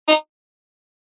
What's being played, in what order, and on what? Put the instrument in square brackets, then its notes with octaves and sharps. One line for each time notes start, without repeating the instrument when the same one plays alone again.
[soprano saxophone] D#4